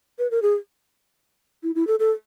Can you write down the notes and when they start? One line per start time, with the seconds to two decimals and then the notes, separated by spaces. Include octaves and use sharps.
0.19 B4
0.31 A#4
0.42 G#4
1.63 E4
1.75 E4
1.87 A4
2.00 A4